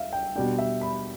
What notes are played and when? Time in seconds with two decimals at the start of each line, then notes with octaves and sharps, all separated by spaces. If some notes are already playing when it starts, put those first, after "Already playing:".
Already playing: E5 F5
0.13 G5
0.35 B2 G3 D4 G5
0.59 E5
0.81 B5